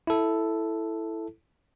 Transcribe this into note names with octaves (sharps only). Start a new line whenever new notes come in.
E4 A4